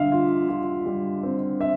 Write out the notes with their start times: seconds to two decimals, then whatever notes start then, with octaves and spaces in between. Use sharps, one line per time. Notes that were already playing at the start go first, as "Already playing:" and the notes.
Already playing: D3 G3 E5 F5
0.12 F4
0.49 F4
0.86 G3
1.23 C4
1.60 C4 E5